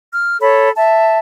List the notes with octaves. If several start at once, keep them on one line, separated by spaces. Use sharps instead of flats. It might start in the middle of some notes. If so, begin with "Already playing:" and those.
F6
A4 C#5 B5
E5 A5